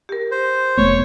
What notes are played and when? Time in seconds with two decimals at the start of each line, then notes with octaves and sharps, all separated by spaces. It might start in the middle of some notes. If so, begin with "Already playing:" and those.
0.09 G4 A#4
0.31 C5
0.77 F1 A3 B3 C#5